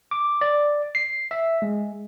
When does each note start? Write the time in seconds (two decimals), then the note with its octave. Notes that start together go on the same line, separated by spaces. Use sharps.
0.11 D6
0.41 D5
0.95 C7
1.31 E5
1.62 G#3